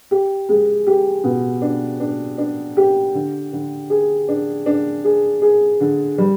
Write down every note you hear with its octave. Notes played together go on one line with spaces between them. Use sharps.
G4
G#3
G4
B2
D4
D4
D4
G4
D3
D3
G#4
D4
D4
G#4
G#4
D3
G3